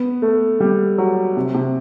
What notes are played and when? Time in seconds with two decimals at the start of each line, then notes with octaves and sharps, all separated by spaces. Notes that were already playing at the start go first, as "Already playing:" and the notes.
Already playing: B3
0.22 A3
0.60 G3
0.98 F#3
1.37 C3
1.54 C3